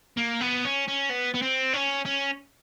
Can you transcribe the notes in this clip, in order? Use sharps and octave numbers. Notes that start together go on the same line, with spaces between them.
A#3
B3
C#4
C#4
B3
B3
C4
C#4
C#4